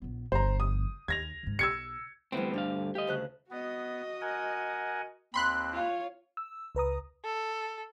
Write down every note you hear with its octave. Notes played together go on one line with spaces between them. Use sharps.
A#1 B3
G1 F3 C5 A#5
D#6
D#2 G#6 A#6 F7
G#2 D#3
B1 E6 G#6 C#7
D2 E3 G3 B3 C4
G2 D3 G4 F5
G4 D#5 F5
D2 C#3 F#6
B3 F#4 D#5
A#4 F#5 G#5
D#2 C4 B5 C6 F#6
F4 C#5
E6
C#2 B4 A#5 D#6
A4